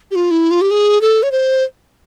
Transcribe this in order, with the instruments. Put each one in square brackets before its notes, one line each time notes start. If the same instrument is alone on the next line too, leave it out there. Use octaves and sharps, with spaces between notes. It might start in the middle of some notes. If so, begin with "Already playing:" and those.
[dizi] G4
F4
E4
F4
G4
G#4
A4
C#5
C5